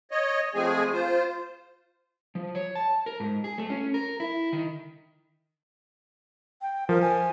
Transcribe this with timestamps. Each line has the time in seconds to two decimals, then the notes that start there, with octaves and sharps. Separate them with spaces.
0.11 C#5 D#5
0.55 F3 G#3 A3 C4 G#4 G#5
0.93 F4 C5
2.35 F3
2.55 C#5
2.75 A5
3.06 A#4
3.20 G#2
3.44 G#4
3.58 A3
3.70 C#4
3.94 A#4
4.20 E4
4.53 D#3
6.62 G5
6.89 F3 A#4
7.02 G#5